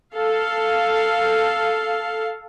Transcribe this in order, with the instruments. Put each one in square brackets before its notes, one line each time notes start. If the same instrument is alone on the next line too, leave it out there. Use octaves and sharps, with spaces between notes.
[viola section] A4 F5